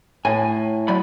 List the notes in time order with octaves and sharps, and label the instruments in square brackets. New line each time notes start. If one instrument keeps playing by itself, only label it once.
[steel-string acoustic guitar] A2 [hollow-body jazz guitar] G#5
[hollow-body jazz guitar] F#3 D5 B5